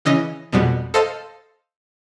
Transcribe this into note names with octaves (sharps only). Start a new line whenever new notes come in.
C#3 E3 C#4 D#5 D#6 A#6
F2 B2 G3 G#3 B3
A4 C5 D#5 F5 A5 C6